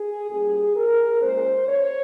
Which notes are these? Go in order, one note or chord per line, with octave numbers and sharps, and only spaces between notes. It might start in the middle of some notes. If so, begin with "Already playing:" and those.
Already playing: G#4
A#2 G3 C#4 G#4
A#4
A#2 G#3 C#4 C5
C#5